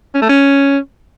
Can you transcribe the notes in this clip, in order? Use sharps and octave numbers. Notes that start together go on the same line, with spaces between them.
C#4
A3
C#4